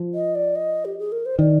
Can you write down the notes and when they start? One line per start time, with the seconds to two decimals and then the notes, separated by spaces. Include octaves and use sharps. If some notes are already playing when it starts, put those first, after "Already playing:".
Already playing: F3
0.14 D#5
0.35 D5
0.55 D#5
0.85 G4
0.99 G#4
1.12 A#4
1.25 C5
1.39 D#3 D5